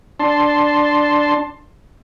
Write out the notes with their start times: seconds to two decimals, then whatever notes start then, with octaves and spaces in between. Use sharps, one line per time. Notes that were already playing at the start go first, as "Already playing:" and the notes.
0.20 D4 A5 C6